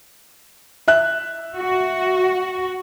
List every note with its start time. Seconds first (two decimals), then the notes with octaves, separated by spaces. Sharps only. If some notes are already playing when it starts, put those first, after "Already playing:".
0.88 E5 F#6
1.55 F#4